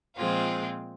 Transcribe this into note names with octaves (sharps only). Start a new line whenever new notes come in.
A#2 F3 G#3 C4 F4